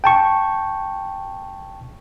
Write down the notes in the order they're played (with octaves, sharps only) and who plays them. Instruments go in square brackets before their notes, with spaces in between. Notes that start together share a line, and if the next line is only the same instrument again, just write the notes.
[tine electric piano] G5 A5 C#6